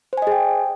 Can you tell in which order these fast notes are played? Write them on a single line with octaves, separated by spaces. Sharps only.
C5 G#5 D#5 G#4 G5